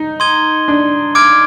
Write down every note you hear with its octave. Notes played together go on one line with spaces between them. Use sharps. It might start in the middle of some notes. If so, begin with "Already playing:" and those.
Already playing: D#4
C6 D#6 G#6 D#7 G7
D4
D6 F6 G#6 D7